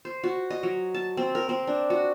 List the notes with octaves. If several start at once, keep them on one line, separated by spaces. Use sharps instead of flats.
C5
F#4
D#5
F#3
A5
C4
A#4
C4
D4
F#4